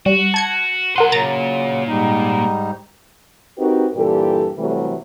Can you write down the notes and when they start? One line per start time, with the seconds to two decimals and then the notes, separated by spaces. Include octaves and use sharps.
0.06 G3 F#4
0.34 A5 G#6 C#7
0.96 F#3 A#4 B4 F#5 C6
1.12 A#2 C#3 F#3 A#5 A6
1.87 G#2 G3 D#4
3.58 C4 D#4 F#4 G4 A#4 B4
3.96 G2 A#2 E3 G4 A4
4.58 C3 E3 F#3 G3 A3